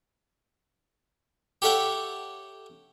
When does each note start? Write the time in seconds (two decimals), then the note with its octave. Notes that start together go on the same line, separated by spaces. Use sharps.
1.62 G4 A4 C#5 E5 F#5 G5